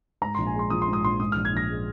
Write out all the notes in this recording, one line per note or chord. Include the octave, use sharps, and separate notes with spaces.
G#2 A#5
A#1 C6
G#5
G#3 C6
F3 D#6
C6
G#2
D#6
A#1 C6
G#2 D#6
A#1 F6
G#6
A#1 A#6
G#3